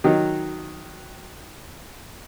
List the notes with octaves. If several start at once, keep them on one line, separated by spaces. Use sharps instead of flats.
D#3 F#3